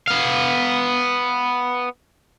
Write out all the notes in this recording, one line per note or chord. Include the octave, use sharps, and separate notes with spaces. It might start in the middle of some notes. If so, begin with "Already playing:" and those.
B3 F5